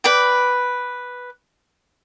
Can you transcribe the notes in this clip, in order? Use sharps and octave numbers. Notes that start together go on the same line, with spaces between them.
B4 D5 G5